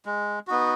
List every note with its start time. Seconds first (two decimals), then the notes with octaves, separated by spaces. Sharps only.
0.06 G#3
0.47 B3 D#4 F#4